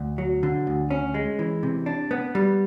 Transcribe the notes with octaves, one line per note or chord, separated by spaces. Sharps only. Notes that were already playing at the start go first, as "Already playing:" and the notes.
Already playing: D2
F#3
D3
D2
C#4
G#3
E3
C3
D4
B3
G3